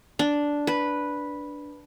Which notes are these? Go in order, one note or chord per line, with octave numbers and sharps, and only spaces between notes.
D4
B4